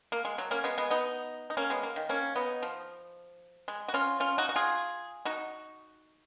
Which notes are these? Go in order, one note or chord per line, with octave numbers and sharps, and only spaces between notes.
A#3
G#3
F#3
A#3 C#4
G#3 B3
G#3 B3
B3 D#4
D#4
A#3 C#4
G#3 B3
A#3
D#3
A#3 C#4
B3 D#4
F3
G#3
F#4
C#4 F4
C#4 F4
D#4 F#4
F#4
F4 G#4
D#4 F#4